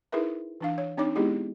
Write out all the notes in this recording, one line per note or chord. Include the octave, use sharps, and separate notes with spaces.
D#4 E4 G#4 A#4 B4 E5
E3 D4 F5
C#5
C4 D4 D#4 C#5 D6
G#3 B3 D#4 E4 G4 G#4